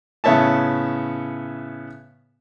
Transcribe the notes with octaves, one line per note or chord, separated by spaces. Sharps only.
A2 C#3 B3 C#5 E5 A5